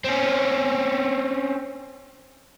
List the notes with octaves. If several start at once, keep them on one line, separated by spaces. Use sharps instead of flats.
C4 C#4